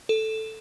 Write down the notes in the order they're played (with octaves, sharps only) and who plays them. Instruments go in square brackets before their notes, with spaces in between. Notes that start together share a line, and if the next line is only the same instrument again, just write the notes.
[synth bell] A4